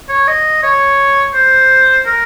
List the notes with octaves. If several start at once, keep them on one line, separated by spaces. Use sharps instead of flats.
C#5
D#5
C#5
C5
A#4